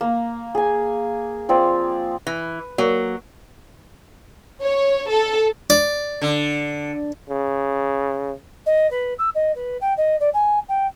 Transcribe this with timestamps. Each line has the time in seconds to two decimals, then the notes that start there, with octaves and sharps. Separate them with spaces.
0.01 A#3
0.55 G#4 G#5
1.49 F3 C4 D5
2.27 E3
2.78 F#3 A#3
4.63 C#5
5.10 A4
5.70 D5
6.22 D3
7.30 C#3
8.66 D#5
8.91 B4
9.19 E6
9.35 D#5
9.55 B4
9.81 G5
9.97 D#5
10.20 D5
10.34 G#5
10.69 G5